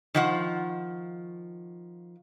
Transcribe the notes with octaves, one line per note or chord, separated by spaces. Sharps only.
D#3 F3 F#5